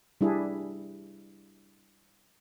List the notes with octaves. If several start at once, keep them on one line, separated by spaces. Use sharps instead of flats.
G3 D4 E4 G#4